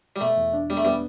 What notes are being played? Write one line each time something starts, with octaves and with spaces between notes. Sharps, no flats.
G3
B2 A3
E2
D4
G3 B3
A3
G3 B3